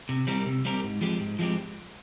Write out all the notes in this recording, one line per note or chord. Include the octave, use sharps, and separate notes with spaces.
C3
G3 C4 G4 A#4
C3
G3 C4 G4 A#4
G#2
F3 G#3 C4 G4
G#2
F3 G#3 C4 G4